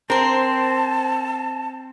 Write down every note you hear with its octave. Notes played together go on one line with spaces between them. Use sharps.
C4 A#4 C5 A5